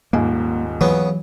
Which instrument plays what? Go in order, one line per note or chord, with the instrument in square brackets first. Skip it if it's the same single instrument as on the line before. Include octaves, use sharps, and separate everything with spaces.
[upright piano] D#1 G#2 G#5 [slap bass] A#3
[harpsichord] C#3 B3 [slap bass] E3 F#3